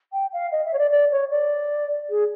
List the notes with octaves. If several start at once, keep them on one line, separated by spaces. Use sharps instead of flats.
G5
F5
D#5
E5
C#5
D5
D5
C#5
D5
G#4